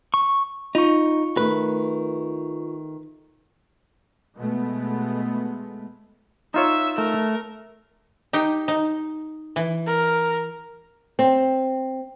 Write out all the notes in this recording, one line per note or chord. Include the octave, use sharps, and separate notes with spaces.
C#6
D#4 F4 C#6
D#3 A3 B4
B2 G#3 A3 B3
D#4 F4 C#5 E5 E6
A3 A#4
D#4 G4 G5
D#4
E3
A#4
C4